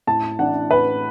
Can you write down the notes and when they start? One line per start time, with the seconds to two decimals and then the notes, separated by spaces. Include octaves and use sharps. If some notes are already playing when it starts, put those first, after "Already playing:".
0.07 A2 A5
0.39 E3 D4 F#5
0.71 A2 B4